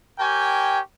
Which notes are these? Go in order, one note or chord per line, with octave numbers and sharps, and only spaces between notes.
G4 A#4 C#5 G5 G#5